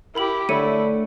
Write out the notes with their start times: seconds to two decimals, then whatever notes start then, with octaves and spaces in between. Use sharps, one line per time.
0.15 E4 G4 A#4 B5 F#7
0.49 D3 A3 E4 C#5 C#7 D#7